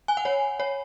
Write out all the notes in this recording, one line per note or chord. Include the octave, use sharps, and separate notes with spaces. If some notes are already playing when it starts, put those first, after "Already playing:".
G#5
F#5
C#5
C#5